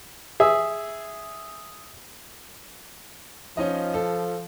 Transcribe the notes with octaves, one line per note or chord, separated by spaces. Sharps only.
G#4 E5
F3 C#4 D#4 D#5
A4